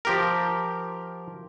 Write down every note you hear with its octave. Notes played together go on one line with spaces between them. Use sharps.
F3 G4 A#4